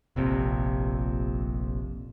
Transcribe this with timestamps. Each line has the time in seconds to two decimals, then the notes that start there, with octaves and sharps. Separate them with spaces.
0.16 F1 A#1 F2 C3